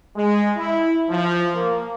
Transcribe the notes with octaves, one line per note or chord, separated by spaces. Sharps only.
G#3
E4
F3
A#3